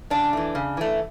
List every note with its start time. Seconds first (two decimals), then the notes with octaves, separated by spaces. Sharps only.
0.10 C#3 D4
0.33 E3 A3
0.55 C#3
0.77 E3 A3